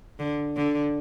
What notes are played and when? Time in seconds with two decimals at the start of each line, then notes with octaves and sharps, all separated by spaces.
0.19 D3
0.57 D3